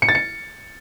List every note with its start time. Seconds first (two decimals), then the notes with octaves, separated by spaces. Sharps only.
0.02 C#7
0.09 A6
0.15 C#7